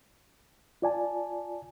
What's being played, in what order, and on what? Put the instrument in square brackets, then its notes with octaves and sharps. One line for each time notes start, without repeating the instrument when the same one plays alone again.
[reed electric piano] F4 D5 G#5 A5